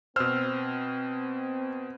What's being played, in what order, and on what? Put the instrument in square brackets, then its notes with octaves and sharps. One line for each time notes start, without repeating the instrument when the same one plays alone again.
[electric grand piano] B2 C5 [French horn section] C4 [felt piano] E6 F6